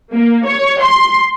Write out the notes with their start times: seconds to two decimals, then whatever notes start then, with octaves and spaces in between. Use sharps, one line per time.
0.14 A#3
0.47 C#5
0.81 C6